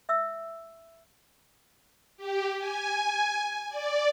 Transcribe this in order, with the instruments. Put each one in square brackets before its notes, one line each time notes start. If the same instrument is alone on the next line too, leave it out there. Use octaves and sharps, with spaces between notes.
[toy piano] E5 E6
[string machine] G4
G#5
D5